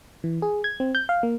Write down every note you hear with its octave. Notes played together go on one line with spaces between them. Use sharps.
E3
G#4
G#6
C4
G6
F5
A#3